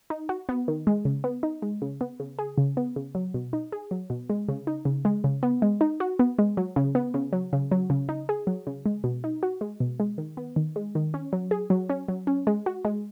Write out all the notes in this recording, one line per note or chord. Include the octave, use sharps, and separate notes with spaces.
D#4
F#4
B3
D#3
G#3
C#3
B3
D#4
G#3
C#3
B3
C#3
G#4
C#3
B3
C#3
F#3
B2
D#4
G#4
F#3
B2
G#3
C#3
D#4
C#3
G#3
C#3
B3
G#3
D#4
F#4
B3
G#3
F#3
C#3
B3
C#3
F#3
C#3
F#3
C#3
D#4
G#4
F#3
C#3
G#3
B2
D#4
F#4
G#3
B2
G#3
D#3
B3
D#3
G#3
D#3
C#4
F#3
G#4
F#3
C#4
F#3
C#4
G#3
F#4
G#3